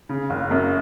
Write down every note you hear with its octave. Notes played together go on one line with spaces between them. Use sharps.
C#3
F#1
F#2